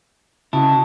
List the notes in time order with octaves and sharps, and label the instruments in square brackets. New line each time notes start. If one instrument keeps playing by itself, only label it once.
[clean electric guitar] C#3 E4 [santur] F#4 D#5 A5